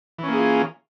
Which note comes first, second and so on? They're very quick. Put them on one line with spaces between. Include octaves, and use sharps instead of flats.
E3 C#4 A#3 G#4 F4